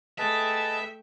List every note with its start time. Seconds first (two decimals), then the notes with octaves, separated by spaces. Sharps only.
0.18 A3 G#4 B4 D#5 E5 G5 A5